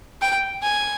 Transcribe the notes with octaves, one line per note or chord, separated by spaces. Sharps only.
G5
G#5